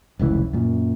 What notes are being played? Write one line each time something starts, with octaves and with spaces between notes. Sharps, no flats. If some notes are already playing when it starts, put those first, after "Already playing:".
F1 C#2 A2 E3
F#2 A#2